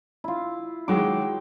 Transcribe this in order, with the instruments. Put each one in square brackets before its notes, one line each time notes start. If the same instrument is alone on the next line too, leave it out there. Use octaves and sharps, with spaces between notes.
[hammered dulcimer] E4 F4
[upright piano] D#3 F#3 G#3 [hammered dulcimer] G5 D6